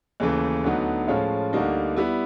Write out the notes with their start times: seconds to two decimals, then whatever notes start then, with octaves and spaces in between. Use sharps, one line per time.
0.20 D#2 C#3 E3 A3
0.64 D2 D3 F#3 B3 D#4
1.08 A2 F3 G#3 C#4 F4
1.53 D2 D3 G3 A#3 D#4
1.97 G3 B3 E4